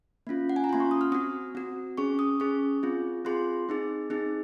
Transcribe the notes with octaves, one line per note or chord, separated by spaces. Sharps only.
A#3 C#4 F4
F#5
G#5
A#5
A#3 C#4 F4 C6
C#6
D#6
F6
C4 F#4 D#6
C4 F#4
C#4 G#4 C#6
D#6
C#4 G#4 C#6
C4 F4 G#4
C4 F4 G#4 C6
C4 D#4 G#4
C4 D#4 G#4